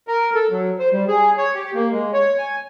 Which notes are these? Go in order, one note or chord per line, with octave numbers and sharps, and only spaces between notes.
A#4
A4
F#3
C5
G3
G#4
C#5
G4
A#3
G#3
C#5
G#5